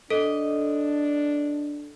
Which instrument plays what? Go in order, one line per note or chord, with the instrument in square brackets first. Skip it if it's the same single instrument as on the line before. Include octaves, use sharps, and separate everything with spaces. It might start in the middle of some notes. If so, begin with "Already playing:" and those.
[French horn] D4 [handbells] A4 [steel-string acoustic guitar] D#5